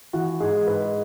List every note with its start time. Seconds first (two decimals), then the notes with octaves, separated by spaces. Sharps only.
0.13 E3 F#4
0.40 G#2 G#4
0.67 G#2 B4